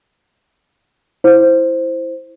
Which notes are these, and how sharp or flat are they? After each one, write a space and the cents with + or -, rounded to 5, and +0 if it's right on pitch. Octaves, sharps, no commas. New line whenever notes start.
E4 +0 C5 +0